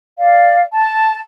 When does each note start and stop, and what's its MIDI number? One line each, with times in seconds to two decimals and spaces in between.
0.18 0.62 74
0.18 0.62 77
0.74 1.18 81